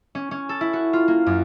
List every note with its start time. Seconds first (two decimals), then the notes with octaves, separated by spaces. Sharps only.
0.15 C#4
0.31 C#4
0.49 A4
0.61 E4
0.73 F#4
0.93 F4
1.08 A#3
1.26 F#2